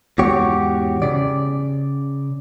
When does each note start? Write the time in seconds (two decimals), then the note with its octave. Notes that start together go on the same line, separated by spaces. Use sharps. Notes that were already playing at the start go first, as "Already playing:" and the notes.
0.18 E2 G#2 F#4 G4 C#5
1.02 C#3 D5